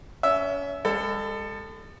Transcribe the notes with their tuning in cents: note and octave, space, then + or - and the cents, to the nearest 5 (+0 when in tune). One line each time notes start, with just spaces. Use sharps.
C#4 +30 E5 +0
G#3 -40 A4 +15